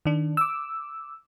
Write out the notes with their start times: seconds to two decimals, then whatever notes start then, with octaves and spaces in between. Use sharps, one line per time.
0.06 D#3 D4
0.37 D6 E6